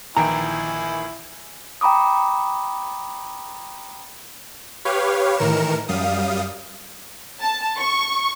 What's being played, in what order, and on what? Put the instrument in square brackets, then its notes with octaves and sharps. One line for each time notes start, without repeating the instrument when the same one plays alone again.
[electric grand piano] A#1 D#3 E3 [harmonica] E4 G#5 [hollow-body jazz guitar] G5 A#5
[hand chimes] G5 A#5 B5 D6 D#6
[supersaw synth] G4 B4 C#5 F5
A2 D#3 E3 A#4 C#7 E7
F#2 G3 F5 D#6
[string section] A5
C#6